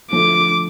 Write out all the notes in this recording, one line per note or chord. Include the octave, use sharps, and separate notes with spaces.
D3 F3 A3 D4 D6